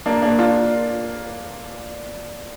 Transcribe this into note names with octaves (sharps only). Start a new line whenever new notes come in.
A#3 D4
A#3 D4
D4 F4